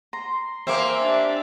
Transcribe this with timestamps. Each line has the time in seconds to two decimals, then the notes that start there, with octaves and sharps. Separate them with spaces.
0.13 A#5 C6
0.67 A#3 C4 C5 E5 G#5 D6
1.00 D4 G4 D5